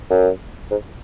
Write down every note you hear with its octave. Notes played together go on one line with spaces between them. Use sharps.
F#2
G#2